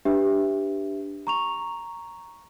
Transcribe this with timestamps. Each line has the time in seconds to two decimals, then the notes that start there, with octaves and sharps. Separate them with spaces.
0.05 D4 G4 B4 E5
1.27 A#5 C#6 F7